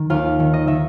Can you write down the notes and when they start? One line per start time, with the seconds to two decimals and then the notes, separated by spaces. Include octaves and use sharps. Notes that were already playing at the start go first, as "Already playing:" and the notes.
Already playing: D#3
0.10 D#2 F4 F5
0.40 D#3
0.53 D#5
0.67 D#3 E5